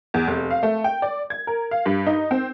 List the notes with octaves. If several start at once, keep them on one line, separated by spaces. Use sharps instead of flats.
E2
F1
F5
A3
G5
D5
G#6
A#4
F5
G2
D#4
C4